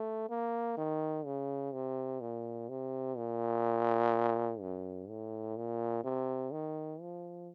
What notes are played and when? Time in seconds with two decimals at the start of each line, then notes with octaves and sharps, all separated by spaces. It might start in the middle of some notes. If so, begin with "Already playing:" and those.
Already playing: A3
0.29 A#3
0.78 D#3
1.25 C#3
1.74 C3
2.21 A#2
2.69 C3
3.17 A#2
4.61 F#2
5.09 A2
5.57 A#2
6.04 C3
6.52 D#3
7.01 F3